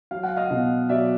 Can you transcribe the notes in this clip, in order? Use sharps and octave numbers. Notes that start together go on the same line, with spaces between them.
F#3 F5
F#5
D#5 F5
B2
F#3 D5 E5